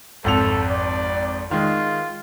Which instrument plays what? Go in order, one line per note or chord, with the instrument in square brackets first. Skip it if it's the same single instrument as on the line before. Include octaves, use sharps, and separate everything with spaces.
[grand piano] G#1 F2 F7 [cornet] A4
[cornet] D5
[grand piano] D#3 G#3 [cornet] F4